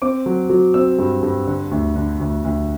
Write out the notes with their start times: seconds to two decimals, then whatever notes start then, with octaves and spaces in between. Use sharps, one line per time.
0.02 C4 D6
0.26 F#3
0.50 F#3
0.74 C4 E6
0.99 G2
1.23 G2
1.47 D3
1.71 D2
1.96 D3
2.20 D2
2.44 D2